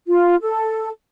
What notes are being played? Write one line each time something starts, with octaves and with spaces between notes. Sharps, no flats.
F4
A4